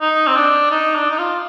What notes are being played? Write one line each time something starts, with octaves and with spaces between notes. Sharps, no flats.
D#4
C4
D4
D#4
D4
D#4
F4